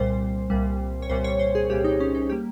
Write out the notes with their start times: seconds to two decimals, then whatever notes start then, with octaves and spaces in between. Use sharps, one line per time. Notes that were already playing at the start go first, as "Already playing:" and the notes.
Already playing: C2 A#2 G3 C5
0.50 C2 A#2 G3
1.02 C#5
1.10 C2 A#2 G3 C5
1.24 C#5
1.39 C5
1.55 G#4
1.70 C2 A#2 G3 G4
1.84 D#4
2.00 C#4
2.15 D#4
2.29 G3 A#3 G4